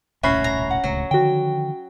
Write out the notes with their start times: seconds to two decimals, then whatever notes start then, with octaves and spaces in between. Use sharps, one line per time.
0.23 D#1 C2 A2 C#4 F#4 E5 B5 C7
0.44 A#5
0.71 F#5
0.84 D1 C#2 F#3 A3
1.11 D3 D#3 F3 F#4 G5